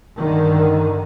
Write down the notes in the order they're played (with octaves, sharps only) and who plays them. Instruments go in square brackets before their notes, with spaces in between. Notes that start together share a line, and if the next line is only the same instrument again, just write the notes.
[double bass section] G2 D3 D#3